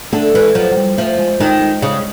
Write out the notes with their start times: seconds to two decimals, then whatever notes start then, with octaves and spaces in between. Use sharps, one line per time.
0.13 D3 A3
0.34 E3 G#3
0.55 F3 F#3
0.71 F#3
0.77 G3
0.98 F3 A3
1.19 G#3
1.40 D#3 G#3
1.61 G#3
1.82 C#3